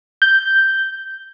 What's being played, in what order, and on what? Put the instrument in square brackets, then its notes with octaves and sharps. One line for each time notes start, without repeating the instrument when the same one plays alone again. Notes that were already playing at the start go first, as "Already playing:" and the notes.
[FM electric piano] G6